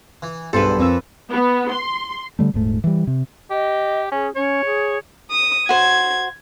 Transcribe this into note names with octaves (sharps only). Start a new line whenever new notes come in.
E3
B1 E2 G2 A4 B4 C5
F2 A#2 C4 E6
B3
C6
D3 G3 A3
D#1 G#2 A3
E3 G3
C3
G4 D#5
C#4 G#4
C#4 C#5
G#4
D#6
F#4 C5 G#6